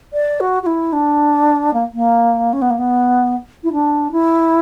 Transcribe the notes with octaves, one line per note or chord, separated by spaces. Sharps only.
D5
F#4
F#4
E4
D4
A#3
A#3
C#4
B3
A#3
B3
E4
D4
E4